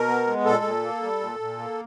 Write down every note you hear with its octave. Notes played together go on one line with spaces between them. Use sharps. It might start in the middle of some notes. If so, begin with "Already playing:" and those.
Already playing: B2 A#4
B3
G#3
A#2 A4
A#2
A#3
G3
A#2
A#2
A#3